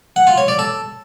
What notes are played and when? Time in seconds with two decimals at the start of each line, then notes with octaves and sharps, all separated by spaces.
0.16 F#5
0.27 F4
0.38 C#5
0.48 D5
0.59 A4